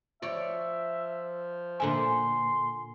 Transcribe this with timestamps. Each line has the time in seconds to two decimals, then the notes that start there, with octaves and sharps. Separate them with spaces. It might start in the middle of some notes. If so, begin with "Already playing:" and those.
0.22 F3 C#5 D5 E5
1.80 A#2 D3 E5 G#5 C6